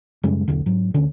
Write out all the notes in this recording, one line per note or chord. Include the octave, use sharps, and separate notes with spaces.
F#2 C#3 G3 G#3
B1 E2 D3
G#2 F#3
D2 D3 C#4